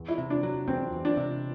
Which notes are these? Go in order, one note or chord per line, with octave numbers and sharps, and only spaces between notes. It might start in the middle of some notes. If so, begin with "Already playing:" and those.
Already playing: E2
E4
C3
D4
F#3
E2 C4
E2
D4
C3